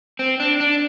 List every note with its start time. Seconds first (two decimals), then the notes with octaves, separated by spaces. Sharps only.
0.19 C4
0.40 D4
0.60 D4